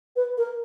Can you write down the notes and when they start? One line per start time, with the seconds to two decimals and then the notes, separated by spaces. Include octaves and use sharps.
0.16 B4
0.38 A#4